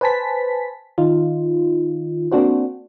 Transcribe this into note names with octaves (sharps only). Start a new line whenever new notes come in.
B4 C5 G#5 A5 B6
D#3 D#4 F4
A#3 C4 D4 F#4 C5